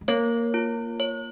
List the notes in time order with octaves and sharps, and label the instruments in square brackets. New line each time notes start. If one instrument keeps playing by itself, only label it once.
[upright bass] G#3
[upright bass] A#3 [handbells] C#5
[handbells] F4
C#5